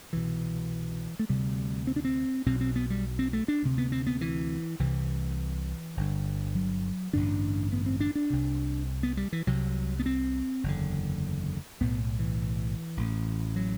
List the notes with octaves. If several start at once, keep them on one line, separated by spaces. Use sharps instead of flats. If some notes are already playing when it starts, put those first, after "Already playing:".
C2 B2 E3
A3
D2 C3 G3
C4
D4
C4
B1 B2 C4
C4
B3
G3
C4
A3
D4
D2 C3
B3
C4
B3
E3
C2 C3 E3
G1 G2 D3
F#3
A1 G2 D3 D4
B3
C4
D4
D4
C2 C3
B3
G3
E3
C2 C3 F#3
B3
C4
F#1 E2 D3
B1 A2 B3
E3
A1 A2
F#3